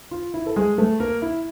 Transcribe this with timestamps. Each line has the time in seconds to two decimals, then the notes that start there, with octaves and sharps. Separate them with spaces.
0.11 F4
0.34 E4
0.46 A4
0.56 G#3 G#4
0.78 A3 A4
1.00 A#3 A#4
1.22 E4